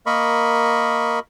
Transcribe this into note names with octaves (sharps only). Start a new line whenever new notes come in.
A#3 A#4 D#5 B5 C#6